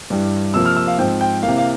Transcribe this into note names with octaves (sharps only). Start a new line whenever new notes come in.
G2 E3 G3
C3 F3 A#3 E6
F6
E6
F5
G#2 F3 C4 G5
G5
C3 E3 A#3 F5
F5